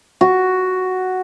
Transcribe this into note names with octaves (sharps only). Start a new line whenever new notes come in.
F#4